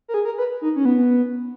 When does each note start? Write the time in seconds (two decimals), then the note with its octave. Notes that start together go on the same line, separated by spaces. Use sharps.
0.08 A#4
0.14 G#4
0.25 A#4
0.38 B4
0.62 D#4
0.76 C#4
0.85 B3